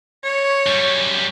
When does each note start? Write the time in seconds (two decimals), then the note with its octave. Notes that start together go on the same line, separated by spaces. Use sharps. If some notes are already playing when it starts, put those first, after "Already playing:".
0.24 C#5
0.67 F#2 G3